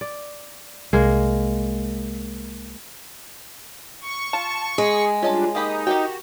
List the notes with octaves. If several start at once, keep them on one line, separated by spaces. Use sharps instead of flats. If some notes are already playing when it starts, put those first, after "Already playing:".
D5
C2 G#3 A#3 A#4
C#6
F4 A5
G#3 G#4
G3 C#4 D4 F4 D#5 A5
A#3 D#4 G4 B5 D#6
F#4 G4 A#4 G5